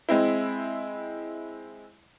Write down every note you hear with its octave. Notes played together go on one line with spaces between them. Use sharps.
G#3 C4 E4